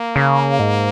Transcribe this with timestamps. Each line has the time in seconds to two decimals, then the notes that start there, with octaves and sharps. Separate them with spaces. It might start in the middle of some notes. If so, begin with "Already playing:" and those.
Already playing: A#3
0.16 C#3
0.59 G#2